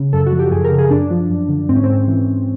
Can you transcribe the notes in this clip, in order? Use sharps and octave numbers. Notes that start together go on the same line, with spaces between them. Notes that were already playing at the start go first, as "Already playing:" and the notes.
Already playing: C#3
F#2 A4
F#4
F3
G4
F#2 G#4
A#4
C#3
G#4
F#2 D4
F3
F#2
D3
G#2 C4
C#4
G#2 C4
E3
E3